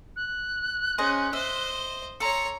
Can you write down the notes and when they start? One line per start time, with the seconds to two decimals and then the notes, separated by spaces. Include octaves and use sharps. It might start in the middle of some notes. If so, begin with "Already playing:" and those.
0.16 F#6
0.98 C#4 G#4 C5 D#5
1.33 C5 D#5 E5
2.20 A4 C#5 A#5 C6 C#7